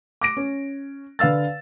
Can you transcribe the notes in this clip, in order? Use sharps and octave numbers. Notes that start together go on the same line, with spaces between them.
D6 A#6 D7
C#4
D3 B4 F5 E6 A6